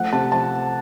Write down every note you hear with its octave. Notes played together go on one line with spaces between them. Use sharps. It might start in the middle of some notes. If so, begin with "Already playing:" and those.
Already playing: F3 A3 F#5
C3 A5
F3 A5